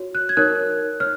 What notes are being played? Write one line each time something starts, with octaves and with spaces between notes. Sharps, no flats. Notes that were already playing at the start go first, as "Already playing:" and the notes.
Already playing: F#4 C#5
F#6
G#6
D#4 A#4 C#5 F#6
C#5 F6